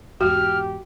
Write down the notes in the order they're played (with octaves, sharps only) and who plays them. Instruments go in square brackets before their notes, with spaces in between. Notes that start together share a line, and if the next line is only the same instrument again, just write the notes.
[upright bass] E2 G#2 [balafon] F#4 [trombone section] G4 [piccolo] F6